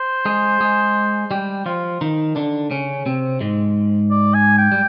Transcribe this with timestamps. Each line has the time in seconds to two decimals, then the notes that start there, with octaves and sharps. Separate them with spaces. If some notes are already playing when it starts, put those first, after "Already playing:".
Already playing: C5
0.25 G#3 G#4
0.61 G#3 G#4
1.31 G3 G4
1.66 F3 F4
2.01 D#3 D#4
2.36 D3 D4
2.71 C#3 C#4
3.06 C3 C4
3.41 G#2 G#3
4.11 D5
4.34 G#5
4.58 G5
4.72 G3